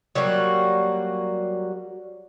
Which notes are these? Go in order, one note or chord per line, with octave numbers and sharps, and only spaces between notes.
F#3 G3 A#3 F#4